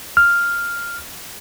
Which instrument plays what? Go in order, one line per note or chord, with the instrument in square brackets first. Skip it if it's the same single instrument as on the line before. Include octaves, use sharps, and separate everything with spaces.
[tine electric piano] F6